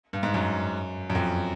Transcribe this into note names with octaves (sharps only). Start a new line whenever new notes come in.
G2
G#2
F#2
F#2
F2